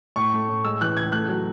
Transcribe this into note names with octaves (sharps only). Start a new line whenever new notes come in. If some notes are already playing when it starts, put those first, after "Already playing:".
A2 C#6
A3
A2
G#3 E6
E3 F#6
C#2 G#6
A3 F#6
F#3